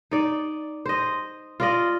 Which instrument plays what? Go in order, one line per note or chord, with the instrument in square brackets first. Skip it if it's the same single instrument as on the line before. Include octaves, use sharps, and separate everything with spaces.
[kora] D#4 D5
C5 D#5
F4 D5 D#5